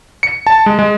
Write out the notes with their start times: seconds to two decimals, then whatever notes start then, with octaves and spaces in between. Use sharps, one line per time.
0.23 C#7
0.47 A5
0.66 G#3
0.79 G#3